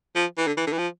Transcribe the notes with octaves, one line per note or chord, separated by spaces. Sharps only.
F3
E3
D3
E3
D3
E3
F3